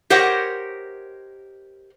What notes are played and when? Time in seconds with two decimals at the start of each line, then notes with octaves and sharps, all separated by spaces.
0.10 G4 A#4 C5 C#5 D#5 F#5